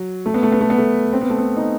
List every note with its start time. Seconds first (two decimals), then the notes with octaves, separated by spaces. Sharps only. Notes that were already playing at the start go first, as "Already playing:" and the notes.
Already playing: F#3
0.26 A3
0.34 B3
0.43 A3
0.52 B3
0.61 A3
0.70 B3
0.78 A3
1.13 C4
1.21 B3
1.30 A3
1.38 B3
1.57 D#4